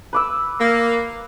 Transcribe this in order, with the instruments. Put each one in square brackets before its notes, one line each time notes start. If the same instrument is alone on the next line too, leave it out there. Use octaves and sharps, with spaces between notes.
[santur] B4 D6 E6
[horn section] A#3